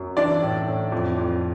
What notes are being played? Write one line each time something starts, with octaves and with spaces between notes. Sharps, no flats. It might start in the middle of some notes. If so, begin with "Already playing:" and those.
Already playing: F#2
E3 D4 D5
A2
A2
F2
F2